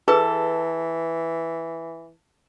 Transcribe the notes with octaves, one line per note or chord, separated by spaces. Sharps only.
E3 G#4 A4 B4